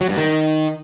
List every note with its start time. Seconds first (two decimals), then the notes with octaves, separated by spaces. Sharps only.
0.01 F#3
0.09 G2
0.17 D#3